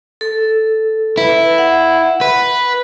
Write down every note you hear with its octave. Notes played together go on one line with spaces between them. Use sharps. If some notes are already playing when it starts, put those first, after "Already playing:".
A4
E4 B4
F#5
B4